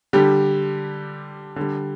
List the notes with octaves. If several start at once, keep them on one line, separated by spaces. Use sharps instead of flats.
D3 G3 G4
D3 G3